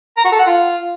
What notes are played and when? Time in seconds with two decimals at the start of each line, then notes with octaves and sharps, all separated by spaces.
0.17 A#5
0.24 F#4
0.32 A4
0.39 F#5
0.47 F4